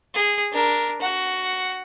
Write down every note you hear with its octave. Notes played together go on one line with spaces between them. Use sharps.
G#4
D4 A#4
F#4 F#5